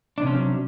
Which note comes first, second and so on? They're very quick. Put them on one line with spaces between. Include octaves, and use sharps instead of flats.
D4 C3 C#4 F3 F#3